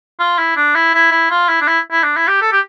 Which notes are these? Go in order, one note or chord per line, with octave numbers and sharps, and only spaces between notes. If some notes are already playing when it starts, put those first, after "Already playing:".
F4
E4
D4
E4
E4
E4
F4
E4
D4
E4
E4
D4
E4
G4
A4
G4